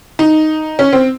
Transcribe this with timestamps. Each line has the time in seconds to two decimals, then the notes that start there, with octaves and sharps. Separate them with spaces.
0.19 D#4
0.79 C#4
0.93 C4